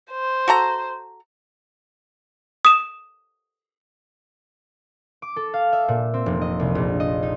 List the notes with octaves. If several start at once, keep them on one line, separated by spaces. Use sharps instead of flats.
C5
F#4 A4 A#5
D#6 E7
D6
A4
F5
E5
A#2
C4
F1
D#5
C2
A#1
D#5
D#4